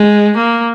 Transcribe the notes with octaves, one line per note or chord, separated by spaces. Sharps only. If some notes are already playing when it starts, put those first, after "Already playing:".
Already playing: G#3
A#3